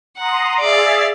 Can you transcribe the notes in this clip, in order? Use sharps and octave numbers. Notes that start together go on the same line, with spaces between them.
F#5 A#5 C6 D#6
G#4 D5 E5 F5 A6